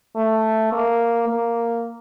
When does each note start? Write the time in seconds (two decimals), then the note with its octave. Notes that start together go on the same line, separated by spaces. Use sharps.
0.16 A3
0.72 A#3
1.28 A#3